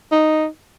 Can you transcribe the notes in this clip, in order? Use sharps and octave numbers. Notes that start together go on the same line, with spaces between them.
D#4